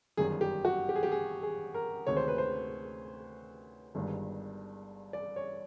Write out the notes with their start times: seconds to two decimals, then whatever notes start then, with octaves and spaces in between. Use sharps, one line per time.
0.17 G1 F#2 D#3 G3 G#4
0.41 G4
0.65 F#4
0.89 G4
0.96 G#4
1.03 G4
1.12 G#4
1.43 G#4
1.74 A#4
2.06 D2 C3 D#3 G#3 C#5
2.17 C5
2.28 B4
2.38 C5
3.95 G1 G2 D#3 G#3
5.13 D5
5.36 C#5